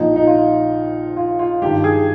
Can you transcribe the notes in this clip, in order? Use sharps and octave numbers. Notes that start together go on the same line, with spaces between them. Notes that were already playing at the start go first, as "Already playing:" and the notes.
Already playing: A#1 A#2 F3 D#4
D#4
F4
F4
F4
G#1 G2 D#3 G4
G#4